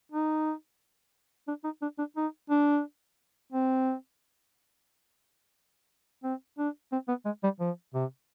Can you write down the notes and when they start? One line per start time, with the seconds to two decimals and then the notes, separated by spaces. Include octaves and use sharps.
0.12 D#4
1.48 D4
1.64 D#4
1.82 D4
1.98 D4
2.16 D#4
2.50 D4
3.52 C4
6.24 C4
6.58 D4
6.92 C4
7.08 B3
7.25 G#3
7.43 G3
7.60 F3
7.94 C3